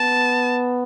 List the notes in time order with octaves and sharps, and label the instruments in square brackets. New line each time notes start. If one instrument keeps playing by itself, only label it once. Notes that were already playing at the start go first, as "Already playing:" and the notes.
Already playing: [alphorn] B3 [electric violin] A5